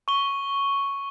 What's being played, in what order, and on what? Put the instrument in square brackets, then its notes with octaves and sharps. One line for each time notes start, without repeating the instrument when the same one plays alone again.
[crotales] C#6 G7